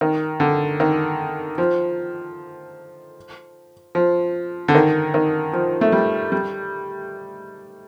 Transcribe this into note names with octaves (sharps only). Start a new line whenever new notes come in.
D#3
D3
D#3
F3
F3
D3
D#3
D#3
F3
A3
G3
G3